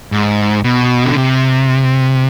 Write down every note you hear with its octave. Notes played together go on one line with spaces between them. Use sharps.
G#2
B2
D3
C3